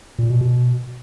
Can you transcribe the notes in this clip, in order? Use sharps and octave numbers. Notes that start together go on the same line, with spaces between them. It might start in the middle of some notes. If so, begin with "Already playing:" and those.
A#2
B2
B2